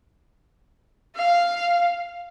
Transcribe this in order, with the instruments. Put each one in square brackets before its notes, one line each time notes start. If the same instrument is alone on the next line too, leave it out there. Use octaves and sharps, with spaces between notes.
[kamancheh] F5